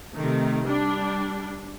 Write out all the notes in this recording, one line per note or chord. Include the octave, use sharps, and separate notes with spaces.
C3 D#3 A3
G3 D4